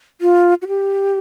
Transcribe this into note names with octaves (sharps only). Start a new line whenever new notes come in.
F4
F#4
G4